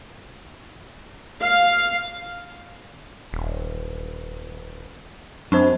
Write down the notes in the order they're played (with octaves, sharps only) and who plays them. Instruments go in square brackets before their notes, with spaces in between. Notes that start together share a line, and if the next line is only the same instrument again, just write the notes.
[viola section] F5
[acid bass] D#1
[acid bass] F#2 [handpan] F#3 C4 [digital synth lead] D4 [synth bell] C5 B5 C#6